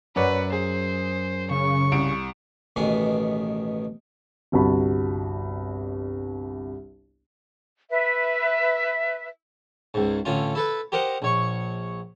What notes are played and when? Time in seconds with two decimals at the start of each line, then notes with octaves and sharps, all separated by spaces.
0.16 F#2 B4 C#5 D5 F#5
0.52 G#4 C5
1.51 C#3 C#6
1.92 C2 D7
2.76 A1 B2 D#3 B3 G#4 G#5
4.52 G1 C2 F#4 A5 B5
7.90 B4 E5
9.94 C#2 G#2
10.25 A1 D3 C#4 F4
10.55 E4 A4 B4
10.92 G4 A#4 C5 D#5 F#5
11.22 A#1 C#5 C#6